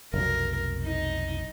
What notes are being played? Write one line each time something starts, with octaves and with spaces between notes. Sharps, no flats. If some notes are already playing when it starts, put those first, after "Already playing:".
F1 B1 A#4
D#4